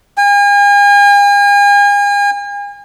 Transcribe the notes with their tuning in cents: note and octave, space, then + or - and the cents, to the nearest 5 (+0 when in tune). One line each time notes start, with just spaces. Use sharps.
G#5 -40